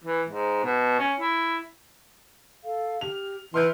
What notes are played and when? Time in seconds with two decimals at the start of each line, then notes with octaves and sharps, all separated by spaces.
0.04 E3
0.29 G#2
0.64 B2
0.99 C#4
1.20 E4
2.64 A4 F5
3.01 G4 F6 F7
3.54 E3 E5 C6 F6 G6